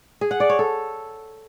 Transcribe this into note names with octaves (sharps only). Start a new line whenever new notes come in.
G#4
F#5
D5
C#5
A4